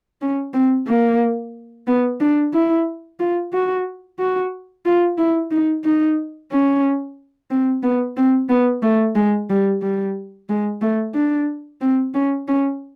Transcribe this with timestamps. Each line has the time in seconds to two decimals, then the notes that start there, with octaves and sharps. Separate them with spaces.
0.21 C#4
0.54 C4
0.87 A#3
1.87 B3
2.21 D4
2.54 E4
3.19 F4
3.53 F#4
4.19 F#4
4.86 F4
5.18 E4
5.51 D#4
5.84 D#4
6.52 C#4
7.51 C4
7.83 B3
8.17 C4
8.49 B3
8.82 A3
9.16 G#3
9.50 G3
9.82 G3
10.49 G#3
10.81 A3
11.15 D4
11.81 C4
12.14 C#4
12.48 C#4